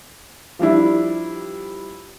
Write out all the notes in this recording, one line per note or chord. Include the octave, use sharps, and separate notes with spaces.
F3 G3 D4 E4